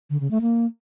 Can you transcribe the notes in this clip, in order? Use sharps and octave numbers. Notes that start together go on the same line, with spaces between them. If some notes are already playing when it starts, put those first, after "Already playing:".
D3
C#3
A3
A#3